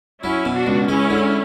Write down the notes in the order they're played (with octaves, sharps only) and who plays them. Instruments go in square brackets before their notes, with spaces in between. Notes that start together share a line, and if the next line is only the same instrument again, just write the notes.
[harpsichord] F#3 [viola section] C#4 E4
[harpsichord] B2
[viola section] D4 F#4
[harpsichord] C#2
[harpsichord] G#3 [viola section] C#4 E4
[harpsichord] D3